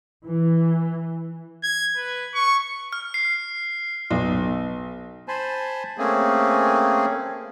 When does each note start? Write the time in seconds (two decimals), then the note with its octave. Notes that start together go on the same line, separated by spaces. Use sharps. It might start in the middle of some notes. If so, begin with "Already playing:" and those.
0.24 E3
1.63 G#6
1.96 B4
2.34 C#6
2.93 F6
3.14 C7
4.11 B1
5.28 C5 G#5 A5 B5 C6
5.98 A3 A#3 C4 C#4 G#4